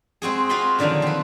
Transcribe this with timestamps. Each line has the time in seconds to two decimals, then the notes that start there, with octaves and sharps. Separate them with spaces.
0.22 G#3 C4 F#4 G#4
0.49 C4 F4 F#4 G#5 B5 C6
0.79 A#2 D3 D#3 F3 F#3
1.02 C4 B4